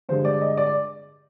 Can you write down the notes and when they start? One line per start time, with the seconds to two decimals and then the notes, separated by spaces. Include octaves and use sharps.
0.09 G2 D3 G#3 C5
0.25 D5
0.41 D#5
0.57 D5